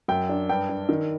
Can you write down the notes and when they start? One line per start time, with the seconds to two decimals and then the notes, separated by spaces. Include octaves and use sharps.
0.08 F#2 G5
0.29 D4
0.49 G2 G5
0.69 D4
0.89 D#3